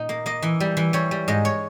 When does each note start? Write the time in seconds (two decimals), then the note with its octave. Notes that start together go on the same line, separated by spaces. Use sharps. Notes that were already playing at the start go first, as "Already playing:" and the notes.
Already playing: A#2 D#4
0.09 A#3
0.26 A#3 D#5
0.42 E3
0.60 G3
0.77 E3
0.93 G3 C#5
1.11 G3
1.28 G#2 D#5
1.45 C#5